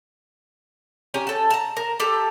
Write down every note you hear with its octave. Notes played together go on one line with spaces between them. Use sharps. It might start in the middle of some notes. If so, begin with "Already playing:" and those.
C#4 G4 G#5 A#5
A4 A5
A5 A#5
A#4
G4 A4